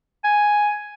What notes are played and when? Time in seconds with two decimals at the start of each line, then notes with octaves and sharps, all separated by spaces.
0.24 G#5